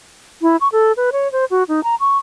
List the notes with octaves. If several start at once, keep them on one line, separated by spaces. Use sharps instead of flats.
E4
C#6
A4
B4
C#5
C5
F#4
D#4
A#5
C#6